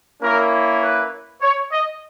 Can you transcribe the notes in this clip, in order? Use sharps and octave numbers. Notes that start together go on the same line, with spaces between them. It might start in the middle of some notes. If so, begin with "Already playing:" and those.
A#3 C#4 E4 A#4
B4
C#5
D#5